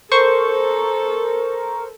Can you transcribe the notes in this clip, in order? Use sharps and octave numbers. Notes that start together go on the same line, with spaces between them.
A4 A#4 C5 C#6